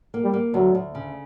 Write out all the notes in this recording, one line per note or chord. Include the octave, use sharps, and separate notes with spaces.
A#3
G3
A#3
D2 F#3
D2
C#3